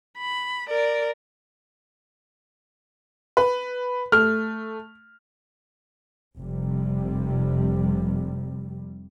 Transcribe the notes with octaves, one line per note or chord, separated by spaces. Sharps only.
B5
A#4 D5
B4
A3 F6
F1 C3 G3